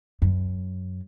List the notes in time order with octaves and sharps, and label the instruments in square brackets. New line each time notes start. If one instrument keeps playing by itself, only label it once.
[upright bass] F#2